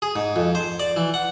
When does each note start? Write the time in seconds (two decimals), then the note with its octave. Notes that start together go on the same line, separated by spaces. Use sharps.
0.02 G#4
0.16 G#2
0.36 F2
0.55 C5
0.80 D5
0.96 E3
1.14 F#5